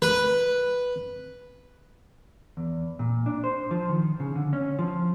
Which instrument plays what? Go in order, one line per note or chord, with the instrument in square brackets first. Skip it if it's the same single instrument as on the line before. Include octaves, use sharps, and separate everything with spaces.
[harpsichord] B4
[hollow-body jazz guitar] E2
A#2
D4
C5
F3
D#3
C#3
D3
C#4
F3